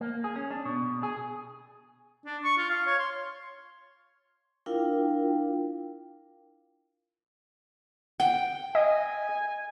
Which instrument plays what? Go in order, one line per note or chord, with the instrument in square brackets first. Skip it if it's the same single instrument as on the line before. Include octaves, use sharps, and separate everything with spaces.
[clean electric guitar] A#3
G#4
C#4
D4
B2
G#4
[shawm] D4
C#6
F4
F5
C#5
C6
[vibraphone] D4 E4 F4 A#4 F5 G5
[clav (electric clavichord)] F#5 [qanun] G5
[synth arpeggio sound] D#5 [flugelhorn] G#5